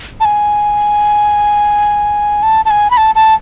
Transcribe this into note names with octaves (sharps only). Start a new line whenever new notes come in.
A5
G#5
A5
A5
G#5
B5
A5
A5